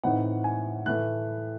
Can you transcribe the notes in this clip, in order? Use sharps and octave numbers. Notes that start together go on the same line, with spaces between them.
A2 E3 C4 D#4 F#5
G#5
A2 E3 A3 F#6